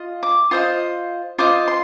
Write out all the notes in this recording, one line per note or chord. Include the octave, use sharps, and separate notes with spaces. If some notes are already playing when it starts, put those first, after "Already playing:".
Already playing: F4 D#5
D6
F4 C5 D#5 D#6
F4 C5 D#5 D6
C6